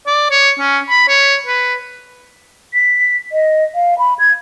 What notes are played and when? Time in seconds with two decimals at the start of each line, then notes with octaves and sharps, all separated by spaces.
0.06 D5
0.30 C#5
0.59 C#4
0.89 B5
1.08 C#5
1.46 B4
2.74 B6
3.32 D#5
3.75 F5
3.99 B5
4.19 G#6